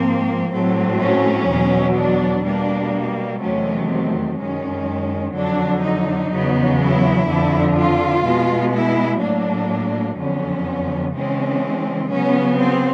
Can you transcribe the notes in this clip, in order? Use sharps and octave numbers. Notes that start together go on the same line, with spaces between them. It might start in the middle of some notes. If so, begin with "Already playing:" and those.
Already playing: G#2 F3 A#3 C4
A2 F#3 A3 C4
C#4
E2 B2 F#3
D4
B2 G3 A#3 D4
E2 C3 D#3 F#3 A3 C#4
C4
F#2 D#3 G#3 C#4
F2 D3 F#3 D4
D#4
E2 C#3 F#3 B3
E4
F2 D3 F3
F4
B2 G#3 B3
E4
A2 F#3 A#3 D4
F2 D3 F#3 B3 C#4
C#3 E3 G#3 C4 C#4
C#3 F#3 B3 C#4
C4